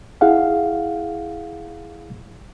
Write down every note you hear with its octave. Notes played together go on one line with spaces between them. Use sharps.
E4 G#4 F5 F#5